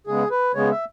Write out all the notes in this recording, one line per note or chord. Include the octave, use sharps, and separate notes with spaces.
C#3 G#3 B3 G#4
B4
C#3 G#3 B3 C#5
E5